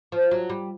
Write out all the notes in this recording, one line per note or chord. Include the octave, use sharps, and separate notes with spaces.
F3
F#3
G3